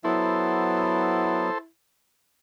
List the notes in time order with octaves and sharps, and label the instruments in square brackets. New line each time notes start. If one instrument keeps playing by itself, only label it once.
[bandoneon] F#3 B3 [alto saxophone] E4 [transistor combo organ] A4 C5